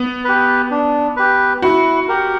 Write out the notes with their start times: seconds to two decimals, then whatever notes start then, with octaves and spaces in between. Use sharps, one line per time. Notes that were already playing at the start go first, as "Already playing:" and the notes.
Already playing: B3
0.25 G4 B4
0.71 D4
1.17 G4 B4
1.62 E4 F#4
2.08 G4 A#4